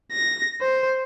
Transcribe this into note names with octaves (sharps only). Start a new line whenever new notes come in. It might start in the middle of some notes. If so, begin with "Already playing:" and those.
A#6
C5